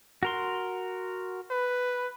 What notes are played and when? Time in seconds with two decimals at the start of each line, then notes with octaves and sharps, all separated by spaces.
0.23 F#4 A#4 C6
1.51 B4